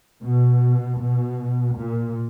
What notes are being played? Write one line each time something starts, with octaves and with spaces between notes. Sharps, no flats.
B2
B2
A#2